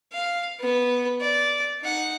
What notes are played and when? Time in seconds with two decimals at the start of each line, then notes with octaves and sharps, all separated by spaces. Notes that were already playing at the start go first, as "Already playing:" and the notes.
0.13 F5
0.60 B3 B4
1.20 D5
1.82 D#4 F#5